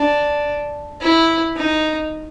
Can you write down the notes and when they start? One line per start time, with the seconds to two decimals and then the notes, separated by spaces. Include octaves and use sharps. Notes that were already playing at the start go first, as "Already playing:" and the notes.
Already playing: D4
1.01 E4
1.56 D#4